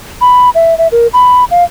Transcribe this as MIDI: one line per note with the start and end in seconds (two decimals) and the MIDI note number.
0.21 0.50 83
0.55 0.77 76
0.78 0.88 76
0.92 1.07 70
1.13 1.44 83
1.51 1.64 77